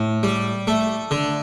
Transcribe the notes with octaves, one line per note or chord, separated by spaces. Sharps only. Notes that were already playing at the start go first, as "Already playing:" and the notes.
Already playing: A2
G3
A3
D3